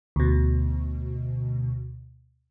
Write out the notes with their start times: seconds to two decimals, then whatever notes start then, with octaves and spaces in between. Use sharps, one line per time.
0.16 D2 B2